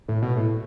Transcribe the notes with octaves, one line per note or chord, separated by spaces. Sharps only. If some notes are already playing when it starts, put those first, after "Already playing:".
A2
B2
A2